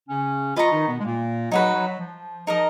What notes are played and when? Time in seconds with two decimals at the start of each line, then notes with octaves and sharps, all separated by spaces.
0.08 C#3 C#4
0.56 F3 F4 B4 D#5 A#5 C#6
0.72 D#3 D#4
0.88 B2 B3
0.99 G#3
1.04 A#2 A#3
1.51 F#3 D#4 F#4 B4
1.75 F#3
1.99 F3
2.47 F3 D#4 A#4 D#5